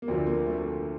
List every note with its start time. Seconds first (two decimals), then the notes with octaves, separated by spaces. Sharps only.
0.02 A#3
0.08 D2 D3 F3 C4
0.27 A#3
0.46 A3
0.65 A#3